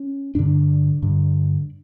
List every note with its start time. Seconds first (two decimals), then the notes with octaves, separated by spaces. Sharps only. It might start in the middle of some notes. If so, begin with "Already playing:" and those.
Already playing: C#4
0.35 G2 D3 D4
1.02 G2 D3